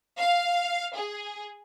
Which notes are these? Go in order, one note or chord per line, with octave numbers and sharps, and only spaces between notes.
F5
G#4